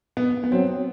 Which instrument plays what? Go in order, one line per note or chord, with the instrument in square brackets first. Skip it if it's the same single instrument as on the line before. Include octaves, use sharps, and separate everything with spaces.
[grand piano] B3
B3
[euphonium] F#3 [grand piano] C4